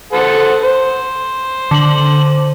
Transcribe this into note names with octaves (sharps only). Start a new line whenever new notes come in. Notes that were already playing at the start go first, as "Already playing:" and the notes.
A4 C5 F#5
C5
D3 F#7